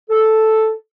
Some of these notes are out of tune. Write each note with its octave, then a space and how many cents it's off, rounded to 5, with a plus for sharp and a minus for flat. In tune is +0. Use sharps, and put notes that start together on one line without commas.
A4 -5